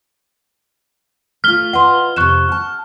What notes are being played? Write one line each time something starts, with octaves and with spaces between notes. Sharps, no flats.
A3 F4 F6 G7
F4 B4 D#5 F#5 C6
F2 C3 C#6 F#6 E7
F#5 A5